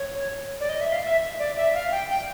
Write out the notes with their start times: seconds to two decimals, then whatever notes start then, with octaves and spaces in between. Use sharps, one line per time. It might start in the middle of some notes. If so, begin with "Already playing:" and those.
Already playing: C#5
0.60 D5
0.69 D#5
0.81 E5
0.92 F5
1.04 E5
1.39 D5
1.57 E5
1.74 F5
1.91 G5
2.09 G5